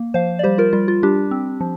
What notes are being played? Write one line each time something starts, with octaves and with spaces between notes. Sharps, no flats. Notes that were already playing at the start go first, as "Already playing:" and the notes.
Already playing: A#3
F3 C5 F5
D5
G3 G4 C5
F4 A#4
G3 F4
F4
G3 D4 G4
C4
F3